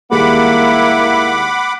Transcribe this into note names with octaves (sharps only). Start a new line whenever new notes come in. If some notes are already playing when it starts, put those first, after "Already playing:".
D#2 G3 G#3 A#3 E4 F#5 B5 D6